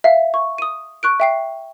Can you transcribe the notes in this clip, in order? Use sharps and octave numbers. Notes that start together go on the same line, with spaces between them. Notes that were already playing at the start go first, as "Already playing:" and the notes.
E5 F5
C#6
D#6 D#7
C#6 F#6 D7
E5 G5 C7